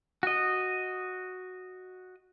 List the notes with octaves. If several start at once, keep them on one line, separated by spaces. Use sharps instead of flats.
F#4 D#5